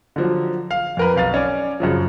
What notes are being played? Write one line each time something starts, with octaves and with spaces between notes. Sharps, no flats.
D3 F3 F#3
F5
F2 A#4 B4
B1 F5 A6
C#4 D5
F#2 C#3 F3